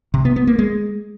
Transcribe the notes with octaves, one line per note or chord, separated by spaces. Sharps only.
C3
B3
B3
A#3
G#3